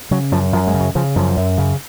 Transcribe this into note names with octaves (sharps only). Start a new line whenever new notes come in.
C#3 F#3
F#2 F3
F#2 F3
G#3
C#3
F#3
C#3 F3
F#2 F3
F#2
C#3